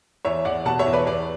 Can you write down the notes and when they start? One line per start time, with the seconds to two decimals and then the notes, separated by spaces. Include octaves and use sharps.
0.25 E2 C#5 E5
0.45 E2 D5 F#5
0.65 B2 F#5 A5
0.79 C#5 E5
0.86 E2
0.93 B4 D5
1.06 E2 B4 D5